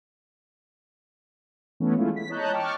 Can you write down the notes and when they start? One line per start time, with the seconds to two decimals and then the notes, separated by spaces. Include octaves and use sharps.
1.80 E3 A3 B3 C#4
1.96 G#3 A3 E4 F4
2.16 B6
2.29 C#5 D#5 A5 A#5 F#6 G6
2.53 G5 A5 C#6 D6 F6